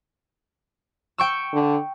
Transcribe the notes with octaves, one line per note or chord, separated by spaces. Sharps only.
G5 C#6 E6
D3